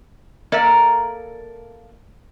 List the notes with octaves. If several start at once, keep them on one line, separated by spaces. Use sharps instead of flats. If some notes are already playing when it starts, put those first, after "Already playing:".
A#3 A4 A#4 D5 E5